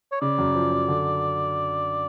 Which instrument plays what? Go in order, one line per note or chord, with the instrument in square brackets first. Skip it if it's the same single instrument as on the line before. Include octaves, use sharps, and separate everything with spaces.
[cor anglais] C#5
[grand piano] C#3 [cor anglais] D5
[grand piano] F#2
F3
F#2
D3